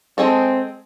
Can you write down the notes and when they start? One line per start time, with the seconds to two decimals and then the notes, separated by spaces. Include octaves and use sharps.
0.18 G#3 C4 G#4 A4